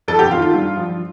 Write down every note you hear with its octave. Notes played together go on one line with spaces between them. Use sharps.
F2 A4
G4
D#3 F4
F4
G2
F3